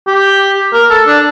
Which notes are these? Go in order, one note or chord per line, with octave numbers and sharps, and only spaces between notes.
G4
A#4
A4
D4